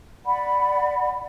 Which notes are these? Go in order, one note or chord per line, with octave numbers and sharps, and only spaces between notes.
D5 F#5 B5